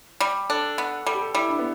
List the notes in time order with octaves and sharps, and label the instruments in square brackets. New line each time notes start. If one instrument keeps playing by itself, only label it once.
[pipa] G3
[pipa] D4 [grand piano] A4
[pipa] B3
[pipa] G3 [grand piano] A4
[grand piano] G4
A4
[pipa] G3 [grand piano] E4
[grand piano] D4
B3